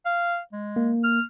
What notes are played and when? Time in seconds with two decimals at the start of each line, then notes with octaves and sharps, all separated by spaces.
0.06 F5
0.53 G#3
0.76 A#3
1.04 F6